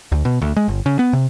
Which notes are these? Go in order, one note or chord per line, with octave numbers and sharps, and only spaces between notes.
D2
B2
D2
G#3
G1
C#3
B3
C3